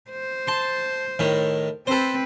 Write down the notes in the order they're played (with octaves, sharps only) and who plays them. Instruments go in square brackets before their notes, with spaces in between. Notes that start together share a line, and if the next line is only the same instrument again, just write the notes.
[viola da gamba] C5
[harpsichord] A5 C6
A2 D#3
[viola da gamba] C4 B4 [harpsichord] A4 C5